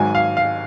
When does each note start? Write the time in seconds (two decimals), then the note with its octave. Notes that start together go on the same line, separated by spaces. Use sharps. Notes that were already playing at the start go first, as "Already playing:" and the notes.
Already playing: G#1 G#2 F#3 G#5
0.15 F5
0.37 F5